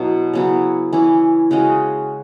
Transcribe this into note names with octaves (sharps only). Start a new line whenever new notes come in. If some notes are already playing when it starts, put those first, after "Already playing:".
Already playing: B2 F#3 E4
C#3 F#3 B3 E4
E3 C#4 E4
C#3 G#3 C#4 F#4